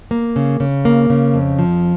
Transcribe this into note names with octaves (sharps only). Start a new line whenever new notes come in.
A#3
C#3
C#3
A#3
C#3
F2
F3